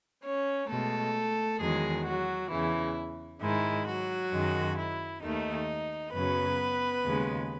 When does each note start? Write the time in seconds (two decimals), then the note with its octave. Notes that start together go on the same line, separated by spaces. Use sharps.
0.24 C#4 C#5
0.69 B2 G#3 A3 A4
1.60 E2 D#3 F#3 G#3 G#4
2.05 F#3 F#4
2.50 E2 C#3 E3 E4
3.41 G#2 D#3 G#3 E4
3.87 F#3 F#4
4.31 F#2 D#3 G#3
4.77 E4
5.23 D#2 D#3 A3 D#4
6.13 F#2 C#3 F#3 B3 B4
7.04 D#2 C#3 G#3